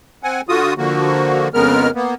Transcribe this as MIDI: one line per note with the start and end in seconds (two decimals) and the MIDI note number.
0.23 0.41 60
0.23 0.41 78
0.23 0.41 80
0.49 0.74 50
0.49 0.74 65
0.49 0.74 66
0.49 0.74 87
0.78 1.48 50
0.78 1.48 53
0.78 1.48 58
0.78 1.48 66
1.54 1.90 41
1.54 1.90 49
1.54 1.90 56
1.54 1.90 59
1.54 1.90 70
1.54 1.90 89
1.95 2.14 58
1.95 2.14 59